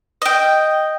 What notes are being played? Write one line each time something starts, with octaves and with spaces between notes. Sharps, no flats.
D#5 G5